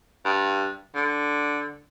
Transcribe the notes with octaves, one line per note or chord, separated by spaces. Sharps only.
G2
D3